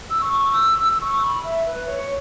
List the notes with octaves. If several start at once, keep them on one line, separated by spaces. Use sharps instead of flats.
E6
C#6
E6
E6
C#6
B5
E5
B4
C#5